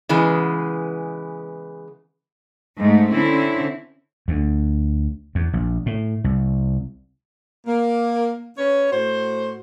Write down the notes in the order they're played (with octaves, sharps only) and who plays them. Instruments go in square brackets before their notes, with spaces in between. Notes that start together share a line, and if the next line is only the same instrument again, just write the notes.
[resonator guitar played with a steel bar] C#3 E3 G#3 B3
[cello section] G#2 A3
D3 C4 C#4 E4
[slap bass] D2
E2
A#1
A2
C2
[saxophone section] A#3
C#4 B4 C#5
A2 F#4 C5